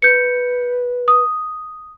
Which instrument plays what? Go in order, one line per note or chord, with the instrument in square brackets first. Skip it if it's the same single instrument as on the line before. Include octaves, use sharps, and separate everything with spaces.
[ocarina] B4 [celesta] G6 C#7
[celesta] D#6